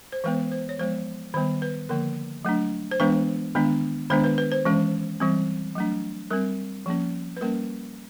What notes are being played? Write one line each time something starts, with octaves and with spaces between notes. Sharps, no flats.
C5
E3 G#3 B3 B4
C5
C#5
F3 G#3 B3 C5
D#3 G3 B3 C5
B4
D3 F3 A#3 A#4
F#3 A3 D4
C5
E3 G#3 B3 D4 B4
D#3 G#3 B3 D4
D#3 G#3 B3 D4 C5
B4
B4
C5
E3 G#3 C#4
E3 G3 C4
F#3 A3 D4
G3 C4 A#4
F3 A#3 C#4
B4
G3 A#3 C#4 A#4